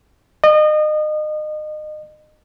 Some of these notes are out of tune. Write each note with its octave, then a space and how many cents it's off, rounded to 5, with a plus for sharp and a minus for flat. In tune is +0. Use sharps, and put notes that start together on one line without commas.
D#5 -30